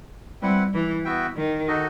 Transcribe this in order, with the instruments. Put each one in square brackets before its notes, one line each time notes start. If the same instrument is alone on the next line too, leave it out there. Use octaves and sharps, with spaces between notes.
[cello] G3 [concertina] C4 E4 B4 F#5
[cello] E3
[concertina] B3 F#4 B4 E5 G5
[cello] D#3
[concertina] D#4 F#4 A4 D#5